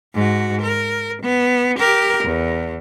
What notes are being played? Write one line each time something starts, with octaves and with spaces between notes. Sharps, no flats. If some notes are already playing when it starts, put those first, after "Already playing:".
G#2 F#4
A#4
B3
G4 A#4
E2